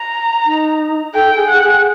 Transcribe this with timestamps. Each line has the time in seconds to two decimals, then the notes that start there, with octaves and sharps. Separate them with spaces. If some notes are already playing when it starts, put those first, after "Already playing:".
Already playing: A#5
0.46 D#4
1.14 A4 G5
1.37 G#4
1.48 F#5
1.61 G#4